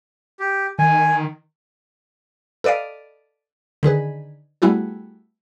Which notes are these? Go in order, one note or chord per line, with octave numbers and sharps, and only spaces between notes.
G4
D#3 G#5
A4 B4 D5 D#5 F5
D3 D#3 G#4 B4
G3 A3 B3 E4 F#4 G#4